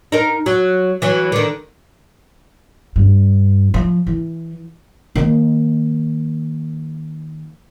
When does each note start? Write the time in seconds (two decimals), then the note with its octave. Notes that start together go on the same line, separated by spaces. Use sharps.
0.12 D#4 A#4
0.46 F#3
1.02 E3 F#3
1.32 D3 D#3
2.96 G2
3.74 F3
4.07 E3
5.15 D#3 A#3